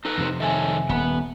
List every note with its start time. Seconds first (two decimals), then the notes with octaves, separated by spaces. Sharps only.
0.05 D#4 A4 B4
0.18 F2 C3 C5
0.40 D#3 A4 C#5 E5 G#5
0.89 D#1 B3